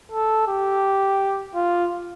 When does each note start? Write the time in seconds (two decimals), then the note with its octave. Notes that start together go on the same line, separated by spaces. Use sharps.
0.12 A4
0.47 G4
1.55 F4